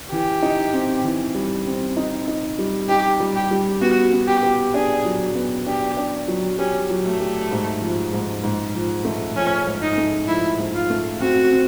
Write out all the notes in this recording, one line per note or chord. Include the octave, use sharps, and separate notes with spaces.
E3 G4
D#4
C4
E3
G3
C4
D#4
D#4
G3
D#4 G4
G3
G4
G3
B3 F#4
B3
G4
G4
D4 G#4
F#3
B3
D4 G4
D4
F#3
C#4 G4
F#3
A3
G4
G#2
F3
G#2
G#2
F3
A3
F3 C#4
G#2
D#4
A3
F3 E4
G#2
F4
A3
C4 F#4
C4